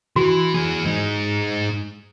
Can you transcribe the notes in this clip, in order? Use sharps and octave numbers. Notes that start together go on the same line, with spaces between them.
E3 F#4
E3 G#4
G#3 D#4